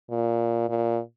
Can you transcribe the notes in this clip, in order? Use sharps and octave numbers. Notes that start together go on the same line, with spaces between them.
A#2
A#2